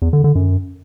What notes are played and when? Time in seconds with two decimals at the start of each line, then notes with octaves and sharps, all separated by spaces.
0.02 E2
0.13 D3
0.24 D3
0.35 F#2